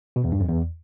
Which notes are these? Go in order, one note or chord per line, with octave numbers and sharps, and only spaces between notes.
B2
E2
G2
F2
E2